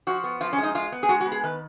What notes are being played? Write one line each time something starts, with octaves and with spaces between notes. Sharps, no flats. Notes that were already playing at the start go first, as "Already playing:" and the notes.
F3 F#4
B3
F3 F4
C#4
G#3
D#4
G#3 F4
B3
G#4
G#3 F#4
F#4
B3
G#4
D#3 B4